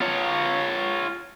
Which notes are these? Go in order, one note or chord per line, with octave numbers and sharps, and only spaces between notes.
F4 C#5